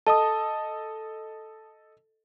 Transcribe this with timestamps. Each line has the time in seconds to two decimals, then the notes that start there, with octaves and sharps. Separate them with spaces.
0.07 A4 D#5 A5 D#6